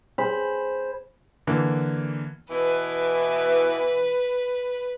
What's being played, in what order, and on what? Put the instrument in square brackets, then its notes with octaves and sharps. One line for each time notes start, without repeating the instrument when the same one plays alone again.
[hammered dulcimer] G#4 C5 B5
[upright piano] D3 E3 A#3
[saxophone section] B2 E3 [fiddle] B4